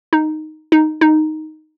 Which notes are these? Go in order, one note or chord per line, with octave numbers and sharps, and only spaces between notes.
D#4
D#4
D#4